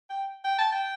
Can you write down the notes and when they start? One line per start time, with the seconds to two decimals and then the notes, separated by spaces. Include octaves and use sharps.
0.10 G5
0.45 G5
0.59 A5
0.72 G5